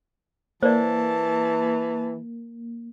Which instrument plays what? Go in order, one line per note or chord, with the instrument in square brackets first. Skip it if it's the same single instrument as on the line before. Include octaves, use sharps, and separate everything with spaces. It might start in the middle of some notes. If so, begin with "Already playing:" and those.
[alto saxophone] E3 [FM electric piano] A#3 [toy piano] C5 D5 [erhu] A5